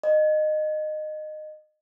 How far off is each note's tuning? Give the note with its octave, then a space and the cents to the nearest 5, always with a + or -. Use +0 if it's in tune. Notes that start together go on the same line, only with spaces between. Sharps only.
D#5 -20